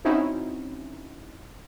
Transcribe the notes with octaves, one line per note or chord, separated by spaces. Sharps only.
C4 C#4 D#4 E4 F#4